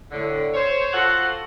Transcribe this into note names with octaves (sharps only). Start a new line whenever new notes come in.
A2 D3
C5 C#5
F4 F#4 A4 C5 F#5